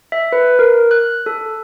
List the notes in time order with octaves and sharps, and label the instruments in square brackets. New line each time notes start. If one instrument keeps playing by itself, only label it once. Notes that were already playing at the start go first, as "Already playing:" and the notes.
[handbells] E5
B4
A#4
F#6
A4